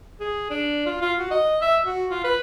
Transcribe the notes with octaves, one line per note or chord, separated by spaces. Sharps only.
G#4
D4
F4
F4
F#4
D#5
E5
F#4
F4
B4